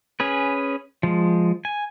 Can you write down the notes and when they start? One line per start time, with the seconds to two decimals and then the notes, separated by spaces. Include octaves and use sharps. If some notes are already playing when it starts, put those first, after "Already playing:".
0.20 C#4 G#4 B4
1.03 F3 G#3
1.65 G#5